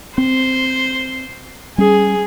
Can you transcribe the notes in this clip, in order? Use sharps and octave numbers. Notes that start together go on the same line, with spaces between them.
C4 C5
G3 C#4 G#4